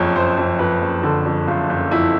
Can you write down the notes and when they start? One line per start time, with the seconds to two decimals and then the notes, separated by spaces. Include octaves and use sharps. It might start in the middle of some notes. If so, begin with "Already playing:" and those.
Already playing: F#1 F2 C#5
0.15 F#1 C5
0.38 F2
0.59 F2 B4
0.81 F#1
1.03 D3
1.26 F2
1.47 F#1 F4
1.70 F#1
1.91 F2 E4